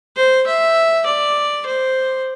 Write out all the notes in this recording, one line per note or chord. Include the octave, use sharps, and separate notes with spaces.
C5
E5
D5
C5